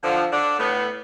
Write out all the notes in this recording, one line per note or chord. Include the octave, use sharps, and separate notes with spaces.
D3 F3
D3 D4
A2 B3